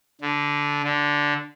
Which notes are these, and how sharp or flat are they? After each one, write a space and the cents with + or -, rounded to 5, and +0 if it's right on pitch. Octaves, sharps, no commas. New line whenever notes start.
D3 -15
D3 -5